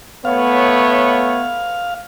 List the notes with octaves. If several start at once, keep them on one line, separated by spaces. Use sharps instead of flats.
A3 B3 C#5 F5